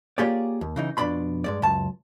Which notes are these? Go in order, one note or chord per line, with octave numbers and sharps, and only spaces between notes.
A#3 F4 G4 G#4 C#5 D5
D#2
C#3 E3 D#4
F2 B2 D4 D5 B5 C6
G2 G#3 D5
C#2 F#2 A5